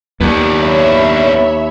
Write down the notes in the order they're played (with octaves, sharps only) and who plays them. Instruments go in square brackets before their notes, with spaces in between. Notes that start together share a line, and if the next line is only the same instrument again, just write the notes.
[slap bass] D#2 [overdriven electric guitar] B3 D4
[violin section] C#5 E5 B5